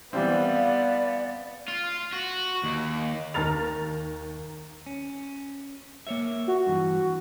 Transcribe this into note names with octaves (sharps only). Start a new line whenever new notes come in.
E3 G3 B3 C4 D5 F5
F4
F#4
D#2
D#2 A#5 F6 A6 F7
C#4
A#3 C#5 E5
F#4
G2 E3